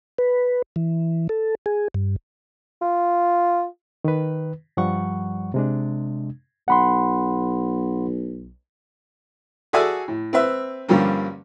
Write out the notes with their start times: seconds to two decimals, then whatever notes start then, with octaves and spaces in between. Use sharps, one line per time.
0.18 B4
0.76 E3
1.29 A4
1.66 G#4
1.94 G2
2.82 F4
4.04 D#3 B4
4.77 G2 F3 G3 F#5 C#6
5.54 C3 G#3 D4
6.68 B1 F#5 B5 C6
9.73 F#4 G#4 A4 D5 E5 G#5
10.08 A2
10.33 C4 B4 E5
10.89 G2 D3 F3 G3 A#3 C#4